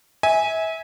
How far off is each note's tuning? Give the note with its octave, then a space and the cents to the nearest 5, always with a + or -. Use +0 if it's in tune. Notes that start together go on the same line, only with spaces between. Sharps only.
E5 -30 G#5 +0